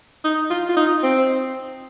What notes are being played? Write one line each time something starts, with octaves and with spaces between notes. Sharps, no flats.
D#4
F4
F4
D#4
C4